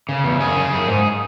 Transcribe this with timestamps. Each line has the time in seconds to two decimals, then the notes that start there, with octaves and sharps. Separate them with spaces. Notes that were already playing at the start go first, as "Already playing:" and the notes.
0.09 C#3
0.24 E2
0.40 F#2 G#4
0.56 C#3
0.72 F#2
0.88 G#2